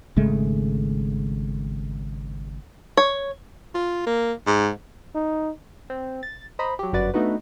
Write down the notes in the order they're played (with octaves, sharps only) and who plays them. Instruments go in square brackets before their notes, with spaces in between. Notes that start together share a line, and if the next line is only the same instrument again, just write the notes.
[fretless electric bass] G#1 C#3 G#3 A3
[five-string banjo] C#5
[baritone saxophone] F4
A#3
G#2
[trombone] D#4
[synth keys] C4
A6
C5 D#5 A#5 B5
F#3 G4
G1 F#2 F#4 B4 D5 A6
A3 B3 D4 D#4 F#4 B4